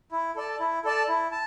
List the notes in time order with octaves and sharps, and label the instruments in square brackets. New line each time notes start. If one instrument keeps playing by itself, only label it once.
[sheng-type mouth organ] E4
A4 D5 A5
E4
A4 D5 A5
E4
A5